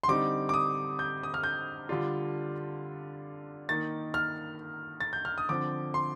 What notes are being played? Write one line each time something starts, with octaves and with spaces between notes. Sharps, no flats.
C6
D3 G3 C4 D#4 D6
D6
D#6
G6
D#6
F6
G6
D3 G3 D4 F4
D#3 A#3 D#4 A6
F6
A6
G6
F6
D#6
D3 F3 C4 D6
C6